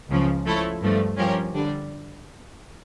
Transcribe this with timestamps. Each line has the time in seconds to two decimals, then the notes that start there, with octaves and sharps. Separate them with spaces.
0.10 C#2 C#3 F3
0.46 F3 A3 E4 A4 C#5
0.81 G2 F3 A3
1.17 G2 F3 C#4 G4 A#4
1.54 D3 G3 D4